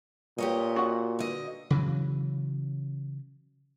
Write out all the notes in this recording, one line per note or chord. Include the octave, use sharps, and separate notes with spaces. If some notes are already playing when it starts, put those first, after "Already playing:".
A#2 G4 C#5 D#5
F#4 F#5
D3 D#5
C#3 E3 F#3